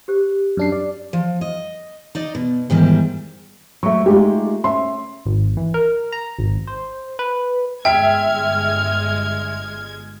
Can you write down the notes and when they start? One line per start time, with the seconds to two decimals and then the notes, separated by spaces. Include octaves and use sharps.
0.08 G4 C5
0.57 F#2 D4 C7
0.72 D5
1.13 F3
1.41 D#5
2.15 D#4 D5 D#5
2.35 B2
2.70 G#2 D#3 E3 G3
3.83 F#3 A3 E5 C#6
4.06 G#3 A3 D#4 F4 G4
4.64 C#4 E5 C6
5.26 G#1
5.57 E3
5.74 A#4
6.12 A#5
6.39 G#1
6.67 C5
7.19 B4
7.85 G1 G#3 E5 G5 F6 G#6 B6